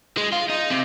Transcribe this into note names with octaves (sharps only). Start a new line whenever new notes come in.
G#3
F4
D#4
C3